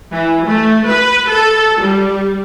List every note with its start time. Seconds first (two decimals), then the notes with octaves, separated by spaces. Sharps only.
0.11 E3
0.46 A3
0.87 B4
1.29 A4
1.81 G3